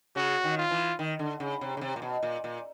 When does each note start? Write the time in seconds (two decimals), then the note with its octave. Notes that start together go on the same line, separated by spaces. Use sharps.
0.16 C#3 F#4
0.44 D#3
0.57 F4
0.71 E3
0.99 D#3
1.19 D3
1.40 C#3
1.61 C3
1.77 C#3
1.81 C3
1.96 A#2
2.02 B2
2.23 A#2
2.44 A#2